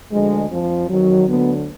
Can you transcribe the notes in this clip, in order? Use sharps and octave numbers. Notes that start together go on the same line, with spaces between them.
D2 D3 F3 G#3
F2 F3
F2 D#3 F#3
D2 D3 F#3 B3